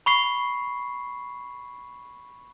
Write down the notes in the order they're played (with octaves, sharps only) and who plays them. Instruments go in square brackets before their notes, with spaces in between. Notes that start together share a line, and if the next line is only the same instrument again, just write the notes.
[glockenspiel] B5 C#6 C7